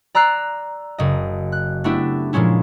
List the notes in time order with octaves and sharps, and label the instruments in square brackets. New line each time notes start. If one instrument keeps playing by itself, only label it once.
[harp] D5 A#5 E6 F#6 C7
F#1 D#5
F#6
A3 B3 D4 E4 G4
A#2 F3 G#3 C#4 E4